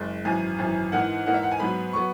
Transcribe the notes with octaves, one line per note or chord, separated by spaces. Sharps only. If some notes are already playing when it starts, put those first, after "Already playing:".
Already playing: F#1 G#3
G#1 F#2 E3 G#5
G#1 F#2 E3
G#2 E3 A#3 D#4 F#5
G#2 E3 A#3 D#4 F#5
E5
F#5
G#5
G#2 F#3 B3 B5
F#3 B3 C#6